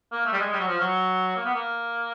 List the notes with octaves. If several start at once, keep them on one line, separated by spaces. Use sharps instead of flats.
A#3
A3
G3
G#3
G3
F#3
F3
F#3
A#3
B3
A#3